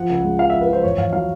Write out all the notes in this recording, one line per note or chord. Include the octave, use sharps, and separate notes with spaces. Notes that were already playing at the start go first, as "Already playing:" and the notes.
Already playing: F3 F#5
C#2
G#3
F3 F5
E5
F3
B4
F3 C5
E2 C#5
E2 F5
F#3 F5